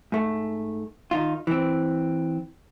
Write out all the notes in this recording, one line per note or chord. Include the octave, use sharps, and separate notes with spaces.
G#2 A3
D#3 D#4 F4
E3 C4